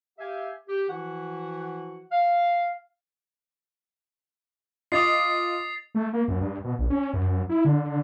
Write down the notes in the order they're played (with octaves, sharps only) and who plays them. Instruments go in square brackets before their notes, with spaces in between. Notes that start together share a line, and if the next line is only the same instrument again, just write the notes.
[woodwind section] G4 E5 F5 G#5
G4
E3 F3 E4 F#4 F#5
F5
[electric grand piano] F4 D6 [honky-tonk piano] D#5 [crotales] D#6 A6 C7
[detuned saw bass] A3
A#3
F#2
G2
B2
A#1
C#4
F#2
F#2
E4
D3
D3